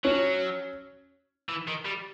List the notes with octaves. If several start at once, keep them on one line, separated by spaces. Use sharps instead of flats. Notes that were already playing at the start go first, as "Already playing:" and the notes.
F#3 C#4
E3
D#3
G3